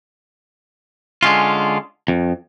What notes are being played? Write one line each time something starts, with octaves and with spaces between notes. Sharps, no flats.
D3 G#3 C#4 F4
F2